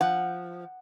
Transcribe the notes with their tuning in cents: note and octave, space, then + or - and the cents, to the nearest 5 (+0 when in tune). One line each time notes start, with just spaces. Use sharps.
F3 +0 F#5 +0